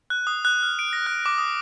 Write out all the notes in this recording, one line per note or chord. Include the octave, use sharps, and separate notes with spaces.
F#6
D#6
F#6
F6
D7
A#6
F#6
D6
D#6